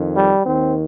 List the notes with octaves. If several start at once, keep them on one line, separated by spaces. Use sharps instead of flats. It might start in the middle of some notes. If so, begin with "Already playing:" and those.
Already playing: F2 D#3
G3
D#2 D#3 C4